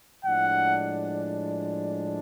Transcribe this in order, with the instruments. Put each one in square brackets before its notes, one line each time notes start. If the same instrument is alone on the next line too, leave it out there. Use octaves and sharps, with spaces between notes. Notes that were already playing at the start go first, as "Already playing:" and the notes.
[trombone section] A2 F3 G#3 D4 [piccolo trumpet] F#5